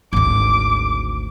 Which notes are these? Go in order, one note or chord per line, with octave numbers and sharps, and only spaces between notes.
G#1 D2 D6